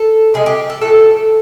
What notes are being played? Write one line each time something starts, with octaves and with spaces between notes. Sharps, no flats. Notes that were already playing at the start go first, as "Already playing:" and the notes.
Already playing: A4
C3 F3 G#3 G#4
G4
A4
A#2 F#3 A3 A4